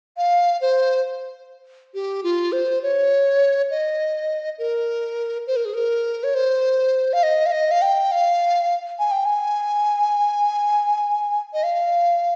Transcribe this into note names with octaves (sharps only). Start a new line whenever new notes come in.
F5
C5
G4
F4
C5
C#5
D#5
A#4
C5
A#4
G#4
A#4
C#5
C5
F5
D#5
F5
D#5
F5
G5
F5
G#5
G5
G#5
D#5
F5